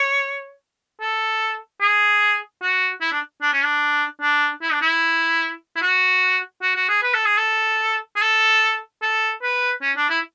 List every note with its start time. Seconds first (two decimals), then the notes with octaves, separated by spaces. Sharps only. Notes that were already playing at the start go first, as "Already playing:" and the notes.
Already playing: C#5
1.01 A4
1.81 G#4
2.62 F#4
3.01 E4
3.12 D4
3.42 D4
3.53 C#4
3.63 D4
4.22 D4
4.62 E4
4.72 D4
4.81 E4
5.76 E4
5.82 F#4
6.62 F#4
6.75 F#4
6.89 G#4
7.03 B4
7.14 A4
7.26 G#4
7.38 A4
8.16 G#4
8.22 A4
9.02 A4
9.43 B4
9.82 C#4
9.97 D4
10.10 E4